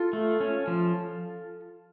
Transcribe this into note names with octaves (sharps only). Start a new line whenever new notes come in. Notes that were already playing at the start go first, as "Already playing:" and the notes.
Already playing: F4 A4
A3
C#4
F3